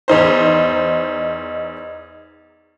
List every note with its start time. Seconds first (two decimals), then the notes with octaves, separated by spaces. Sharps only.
0.08 E2 D#4 C5